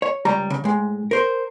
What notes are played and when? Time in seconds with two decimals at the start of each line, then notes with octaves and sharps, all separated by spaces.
0.02 C#5
0.25 C#2 G3 A#5
0.50 C#3
0.64 A2 G#3
1.11 A#4 C5